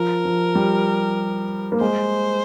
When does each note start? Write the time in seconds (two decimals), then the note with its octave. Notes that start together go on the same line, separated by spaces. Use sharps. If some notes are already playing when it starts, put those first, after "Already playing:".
Already playing: F3 A#4
0.25 F3
0.55 G3
1.72 A#3
1.81 G#3 C5